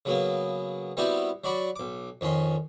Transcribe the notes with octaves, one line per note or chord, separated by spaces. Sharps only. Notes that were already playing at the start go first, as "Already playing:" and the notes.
C#3 F#3 A#3 B3
G3 B3 C4 E4 F#4 G4
F#3 F#4 D5 B5 C#6
B1 D6
F2 D#3 C#4 C6